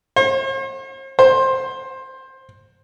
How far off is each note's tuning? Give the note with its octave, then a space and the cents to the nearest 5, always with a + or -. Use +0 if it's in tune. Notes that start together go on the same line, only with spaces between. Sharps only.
C5 +45
C5 +20